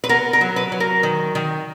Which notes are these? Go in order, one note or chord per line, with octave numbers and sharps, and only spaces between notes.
B4
B3 A#4
A#4
F#3
B4
F#3
A#4
D#3
D#3